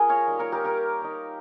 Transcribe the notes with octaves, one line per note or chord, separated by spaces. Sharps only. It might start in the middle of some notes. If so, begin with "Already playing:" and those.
Already playing: A#3 F4 G#4 A#4 D#5
C#5 F5
G3 A#3 D#4
A#4 C#5
G4 A#4
G4 A#4
A#3 D#4